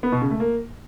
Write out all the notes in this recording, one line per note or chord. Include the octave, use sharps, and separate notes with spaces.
B3
B2
C#3
A3
A#3